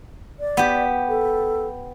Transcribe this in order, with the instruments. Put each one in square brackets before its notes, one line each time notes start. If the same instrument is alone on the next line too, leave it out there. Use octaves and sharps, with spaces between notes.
[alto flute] D5
[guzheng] B3 G4
[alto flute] A4